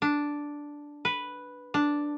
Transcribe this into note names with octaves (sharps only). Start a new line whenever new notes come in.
D4
B4
D4